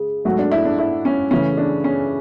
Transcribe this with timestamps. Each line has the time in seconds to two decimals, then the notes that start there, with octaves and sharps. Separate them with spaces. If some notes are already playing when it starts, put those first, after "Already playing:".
Already playing: C#3 G#3
0.25 G#2 F#3 A3 F#4
0.39 D4
0.52 E4
0.65 D4
0.79 E4
1.05 C#4
1.31 C#3 E3 A3 C#4
1.57 D4
1.84 C#4